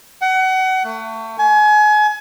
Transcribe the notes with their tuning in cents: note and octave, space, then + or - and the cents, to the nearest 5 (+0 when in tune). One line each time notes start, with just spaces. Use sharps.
F#5 +30
A3 +30
G#5 +30